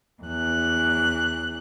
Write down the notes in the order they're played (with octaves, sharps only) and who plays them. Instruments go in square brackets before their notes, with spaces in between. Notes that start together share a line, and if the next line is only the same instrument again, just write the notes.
[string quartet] E2 F#6